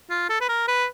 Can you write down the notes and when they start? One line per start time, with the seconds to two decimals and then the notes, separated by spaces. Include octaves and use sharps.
0.10 F4
0.29 A4
0.41 B4
0.49 A#4
0.68 B4